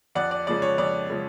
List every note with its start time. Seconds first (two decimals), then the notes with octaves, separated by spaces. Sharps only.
0.15 F2 D5 F#5
0.31 D5
0.47 C#3 F3 G#3 D5
0.62 C#5
0.78 F2 D5
1.10 C#3 F3 G#3